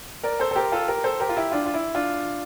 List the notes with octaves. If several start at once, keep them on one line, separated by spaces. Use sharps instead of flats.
A#4 D5
A4 C5
A4
G4 A#4
F4 A4
G4 A#4
A4 C5
G4 A#4
F4
E4 G4
D4 F4
F4
E4
D4 F4